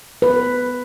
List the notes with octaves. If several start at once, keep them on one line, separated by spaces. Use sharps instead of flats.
B4